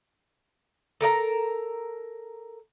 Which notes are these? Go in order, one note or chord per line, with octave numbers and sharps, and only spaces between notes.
A4 A#4 D#5 A#5